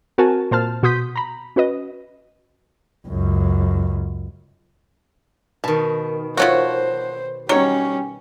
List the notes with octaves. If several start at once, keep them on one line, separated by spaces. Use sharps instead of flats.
C4 F#4 A#4 G#5 A5
A#2 C5 A5 F6
B2 F#4 C6 D#6 G6 B6
A#5 B5
C#4 F#4 B4 D#5
C#2 F#2
B2 D#3 A5
F3 A3 F#4 C5 C#5 F#5
F#3 G3 C#4 D#4 C#5